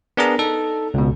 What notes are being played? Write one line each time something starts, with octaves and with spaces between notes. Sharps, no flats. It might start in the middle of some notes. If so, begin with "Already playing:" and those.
B3 D4 G#4 A#4 A#5
D#4 A4
C#2 B2